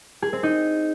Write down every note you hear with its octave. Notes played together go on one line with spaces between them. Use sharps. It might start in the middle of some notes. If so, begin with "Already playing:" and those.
G#4
C4
D#4